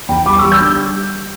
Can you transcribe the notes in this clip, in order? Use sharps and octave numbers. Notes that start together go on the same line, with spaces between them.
E2 G5 B5
G3 B5 D6
C#6 E6
G3
E6 G6
D3